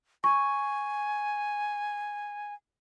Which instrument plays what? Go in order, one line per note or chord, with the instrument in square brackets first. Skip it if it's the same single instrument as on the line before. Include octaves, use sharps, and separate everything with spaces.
[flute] G#5 [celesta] C#6